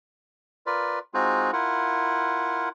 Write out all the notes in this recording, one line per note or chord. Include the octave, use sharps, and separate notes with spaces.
F4 A#4 B4 D5
G#3 C4 D#4 F4 F#4 G#4
E4 F4 A#4 F#5